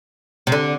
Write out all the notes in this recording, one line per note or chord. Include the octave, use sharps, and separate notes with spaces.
C3
D3